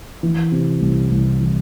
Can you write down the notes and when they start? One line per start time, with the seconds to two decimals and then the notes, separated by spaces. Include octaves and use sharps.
0.23 E3
0.52 C3
0.81 C2
1.10 C2
1.40 E3